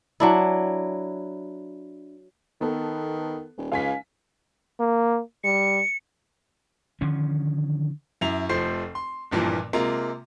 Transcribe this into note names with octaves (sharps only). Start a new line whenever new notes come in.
F#3 D4 E4
D#3 B3 A4
D#1
C#2 F5 G#5 B6
A#3
G3 C#7
D3 D#3 F3 C#4
F#2 E4 F7
F1 F3 A3 C5 C7
C6
F#1 G2 A#2 E3 F3
C3 G#3 A#3 F4 A#5